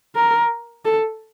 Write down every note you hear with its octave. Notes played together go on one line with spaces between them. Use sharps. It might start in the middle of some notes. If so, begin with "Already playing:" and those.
A#4
A4